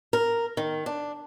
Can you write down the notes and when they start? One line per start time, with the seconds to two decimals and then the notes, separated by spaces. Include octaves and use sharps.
0.13 A#4
0.57 D#3
0.86 D4